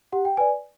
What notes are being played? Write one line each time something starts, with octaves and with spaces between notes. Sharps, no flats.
G4 F#5
G5
B4 D5 G#5